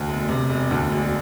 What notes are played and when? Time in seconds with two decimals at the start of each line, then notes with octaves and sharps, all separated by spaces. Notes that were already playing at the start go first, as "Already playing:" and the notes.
Already playing: D2
0.08 E1
0.29 C3
0.49 E1
0.71 D2
0.92 E1